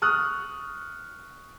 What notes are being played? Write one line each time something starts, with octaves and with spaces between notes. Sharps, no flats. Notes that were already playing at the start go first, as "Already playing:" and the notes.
C#6 D#6 F6 F#6